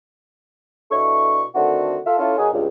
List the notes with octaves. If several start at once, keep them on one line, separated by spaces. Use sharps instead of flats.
B2 D4 E4 A4 C#6
D3 D#3 A3 C4 D4 F#4
F4 A4 E5 F5
C#4 E4 F4 A4
D#3 A#3 C#4 D#4 F#4 G#4
C#2 G2